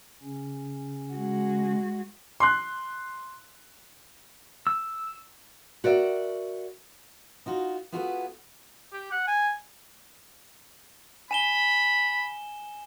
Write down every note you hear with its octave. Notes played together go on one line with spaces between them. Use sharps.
C#3 C#4
G#3 F#4
C6 F#6
E6
F#4 A#4 D5 E5
D#4 F4 F#4
B3 F4 F#4 G#4 A4 B4
G4
F#5
G#5
G#5 B5 E7 G7